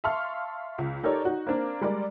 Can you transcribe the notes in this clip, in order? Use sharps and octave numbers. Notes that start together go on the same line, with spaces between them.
E5 F5 A5 C6 C#6 F6
C#2
D#4 G4 A4 A#4 C#5 D5
D#4 F#4
A#3 C4 D4 A#4
G3 G#3 A#4 D5